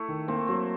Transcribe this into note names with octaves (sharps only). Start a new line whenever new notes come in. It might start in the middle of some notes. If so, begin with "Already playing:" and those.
Already playing: A3 E4
D#3
A#3 C4
F#3 C4